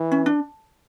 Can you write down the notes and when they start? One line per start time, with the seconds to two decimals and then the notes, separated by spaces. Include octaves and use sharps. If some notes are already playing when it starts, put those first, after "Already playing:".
Already playing: E3
0.12 C#4
0.26 D4